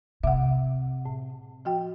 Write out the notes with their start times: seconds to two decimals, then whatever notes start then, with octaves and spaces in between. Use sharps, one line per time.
0.24 C3 E5 F#5
1.05 A2
1.65 F3 F#4 G5